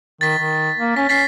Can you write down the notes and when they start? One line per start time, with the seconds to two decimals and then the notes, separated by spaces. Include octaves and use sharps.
0.21 D#3 A6 B6
0.38 D#3
0.76 A#3
0.97 C#4 B6
1.09 C#4 A6 B6 C7